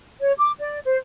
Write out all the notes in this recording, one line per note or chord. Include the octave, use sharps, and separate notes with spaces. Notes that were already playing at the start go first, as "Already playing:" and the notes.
C#5
D6
D5
C5